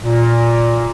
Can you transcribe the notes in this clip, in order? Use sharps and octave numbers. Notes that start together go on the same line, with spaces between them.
A#2